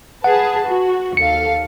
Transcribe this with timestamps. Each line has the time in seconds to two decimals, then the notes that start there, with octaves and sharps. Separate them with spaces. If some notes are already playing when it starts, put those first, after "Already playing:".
0.24 G#4 B4 F#5 A5
0.67 F#4
1.17 D#2 A4 F5 C#7